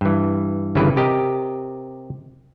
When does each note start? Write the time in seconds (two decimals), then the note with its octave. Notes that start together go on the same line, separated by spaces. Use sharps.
0.01 G2 E3
0.75 G1 G2 C#3 E3 E4 B4
0.96 C3 G4 A#4 D#5